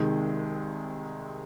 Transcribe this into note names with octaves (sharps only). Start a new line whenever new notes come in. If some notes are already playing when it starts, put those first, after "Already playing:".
Already playing: C2 C3 D#3 G#3